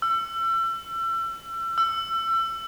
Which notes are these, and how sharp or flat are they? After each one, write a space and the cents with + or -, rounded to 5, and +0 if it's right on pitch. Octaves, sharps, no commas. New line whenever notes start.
E6 +35
E6 +30